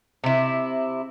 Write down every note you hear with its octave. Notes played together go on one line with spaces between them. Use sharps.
C3 E4